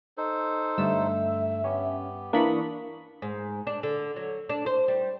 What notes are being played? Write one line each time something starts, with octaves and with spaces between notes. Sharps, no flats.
D#4 A4 C5
G2 D3 A3 E5 E6
B3 C#4 G4
E3 A#3 D4 B5 C#6 D#6
G#2
D4
D3
F#3
D4
C5
G3